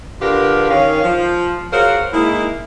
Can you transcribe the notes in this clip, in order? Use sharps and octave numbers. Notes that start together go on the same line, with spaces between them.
D3 D4 F4 G4 A#4 B4
D#3 C#4 F5
F3
F4 F#4 G#4 A#4 C5 C#5
G#3 A#3 D#4 E4